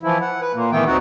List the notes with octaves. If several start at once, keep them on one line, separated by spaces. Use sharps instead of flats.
E3 F3 E4
F#5
B4
A#2 A#3
D#3 E3 A3 B3 G5
D2 C4 D#4 F#4 F#5